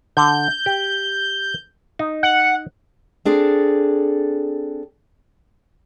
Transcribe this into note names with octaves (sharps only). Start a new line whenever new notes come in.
D3 G6
G4
D#4
F#5
C4 D4 G#4 A4